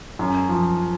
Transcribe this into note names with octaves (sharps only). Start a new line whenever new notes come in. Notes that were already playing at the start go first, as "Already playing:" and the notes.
F#2
F3